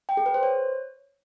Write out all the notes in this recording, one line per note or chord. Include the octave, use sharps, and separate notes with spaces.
G5
G#4
B4
C5
C#5